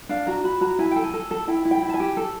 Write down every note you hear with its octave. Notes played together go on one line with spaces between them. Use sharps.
D4 F5
F#4 A#5
F#4 B5
F#4 A#5
E4 G#5
A4 G5
G#5
A4
A4
E4 G5
E4
G5
E4
A5
G#5
G4
A4